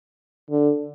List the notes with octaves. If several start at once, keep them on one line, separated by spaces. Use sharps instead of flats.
D3